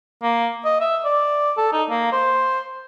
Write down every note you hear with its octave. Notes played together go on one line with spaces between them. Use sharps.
A#3
D#5
E5
D5
A4
D#4
A#3
C5